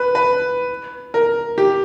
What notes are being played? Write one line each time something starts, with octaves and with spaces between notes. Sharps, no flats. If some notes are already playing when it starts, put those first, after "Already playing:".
Already playing: B4
B4
A#4
G4